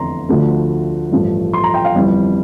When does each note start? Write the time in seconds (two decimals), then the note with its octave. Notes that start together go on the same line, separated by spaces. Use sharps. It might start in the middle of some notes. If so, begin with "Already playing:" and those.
Already playing: F1 E2 D3 A#5 C6
0.29 D2 D3 F3 A3
1.12 A1 G2 F3 A3
1.53 C6
1.64 A#5
1.74 G5
1.85 F5
1.95 G1 F2 E3 G3